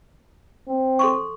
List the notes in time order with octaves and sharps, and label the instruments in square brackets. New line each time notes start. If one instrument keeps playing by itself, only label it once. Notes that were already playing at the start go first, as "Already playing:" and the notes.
[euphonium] C4
[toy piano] A4 C6 C#6